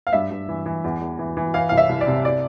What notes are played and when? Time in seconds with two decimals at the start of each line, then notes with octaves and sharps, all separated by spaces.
0.07 F5
0.13 G2 E5
0.30 G2
0.49 E3
0.66 E3
0.84 E2
1.01 E2
1.19 E3
1.37 E3
1.54 E3 F5
1.69 C2 F5
1.78 E5
1.89 C2
2.01 D5
2.07 C3
2.25 D5